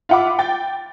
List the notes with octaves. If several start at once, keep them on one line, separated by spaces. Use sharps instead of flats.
F4 E5 F#5 B5 D6
G5 A6